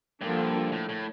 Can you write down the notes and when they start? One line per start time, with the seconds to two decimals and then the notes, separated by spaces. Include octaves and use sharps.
0.21 G2 D3 F3 A#3 D4
0.72 A2
0.89 A2